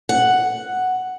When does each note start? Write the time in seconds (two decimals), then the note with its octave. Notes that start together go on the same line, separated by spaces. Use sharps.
0.09 F#5